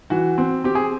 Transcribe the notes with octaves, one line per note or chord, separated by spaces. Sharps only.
E3 F#4
C4
C4 G4
G#4